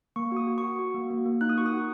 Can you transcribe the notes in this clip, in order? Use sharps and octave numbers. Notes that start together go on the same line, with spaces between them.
A#3 C#6
F#4 D#6
F#4
F#4 C#6
F#4
A#3
A#3
A#3
D#4 F#6
D#6
F#4 C#6
D#6
F#4